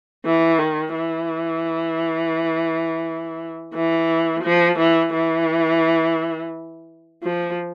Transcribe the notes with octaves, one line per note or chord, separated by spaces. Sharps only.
E3
D#3
E3
E3
F3
E3
E3
F3